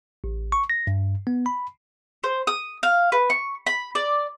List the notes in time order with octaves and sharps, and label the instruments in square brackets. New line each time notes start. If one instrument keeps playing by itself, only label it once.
[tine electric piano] A1
C#6
A#6
G2
B3
B5
[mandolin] C5
D#6
F5
B4
C#6
B5
D5